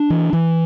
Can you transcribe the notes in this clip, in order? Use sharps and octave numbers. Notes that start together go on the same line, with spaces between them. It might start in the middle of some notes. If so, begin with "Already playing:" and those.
Already playing: D4
E3
E3